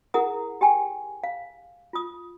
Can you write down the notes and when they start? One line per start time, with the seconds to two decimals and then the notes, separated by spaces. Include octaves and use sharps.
0.14 E4 G#4 A#4 F#5 A#5 D#6
0.61 G4 G5 G#5
1.24 F5
1.93 F4 D#6